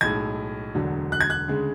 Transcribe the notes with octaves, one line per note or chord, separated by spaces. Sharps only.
B1 A2 G#3 G#6
E1 D2 D3 F#3
F#6
G#6
F#6
D2 C#3 G#3